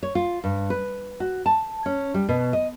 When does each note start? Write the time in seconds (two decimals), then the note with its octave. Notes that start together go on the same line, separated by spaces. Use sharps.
0.03 C#5
0.15 F4
0.44 G2
0.70 B4
1.20 F#4
1.46 A5
1.86 C#4
2.14 G3
2.29 B2
2.53 D#5